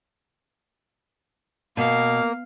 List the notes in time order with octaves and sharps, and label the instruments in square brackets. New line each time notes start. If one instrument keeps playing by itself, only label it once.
[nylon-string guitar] B2 [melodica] A#3 [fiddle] F5